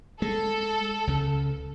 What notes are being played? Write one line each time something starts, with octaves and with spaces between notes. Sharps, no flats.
G#3 A4
C#2 C#3